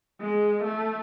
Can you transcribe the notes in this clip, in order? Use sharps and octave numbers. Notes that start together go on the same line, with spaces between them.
G#3
A3